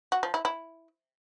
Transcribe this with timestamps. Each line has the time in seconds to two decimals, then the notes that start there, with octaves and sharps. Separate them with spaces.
0.12 F#4
0.23 F3
0.34 E4
0.45 E4